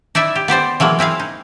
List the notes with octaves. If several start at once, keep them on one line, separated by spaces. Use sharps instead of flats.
D#4 E4 D5 E5 G#5
G4
B3 G4 C5 D5
E3 F#3 G#3 A#3
C4 E4 G#4 F5
D#4